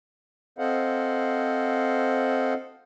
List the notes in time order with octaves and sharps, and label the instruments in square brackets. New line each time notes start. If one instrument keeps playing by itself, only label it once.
[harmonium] C4 A4 C5 D#5 F5 F#5